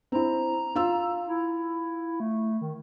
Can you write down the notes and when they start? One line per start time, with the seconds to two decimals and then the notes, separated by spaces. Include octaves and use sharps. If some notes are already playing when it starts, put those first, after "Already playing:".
0.12 C4 E4 A#5
0.75 F4 E6
1.28 E4
2.20 A3
2.61 D#3